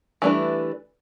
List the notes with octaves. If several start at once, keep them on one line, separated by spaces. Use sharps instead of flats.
E3 G3 A3 D4 B4